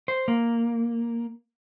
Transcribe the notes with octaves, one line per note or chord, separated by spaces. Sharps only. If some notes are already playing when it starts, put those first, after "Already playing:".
C5
A#3